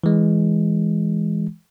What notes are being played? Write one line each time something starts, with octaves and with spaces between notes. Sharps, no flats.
E3 G#3